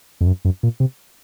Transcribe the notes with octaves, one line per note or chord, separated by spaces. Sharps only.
F2
F#2
F#2
A#2
C3